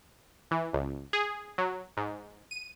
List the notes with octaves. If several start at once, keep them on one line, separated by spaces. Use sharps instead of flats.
E3
C#2
G#4
F#3
G#2
D#7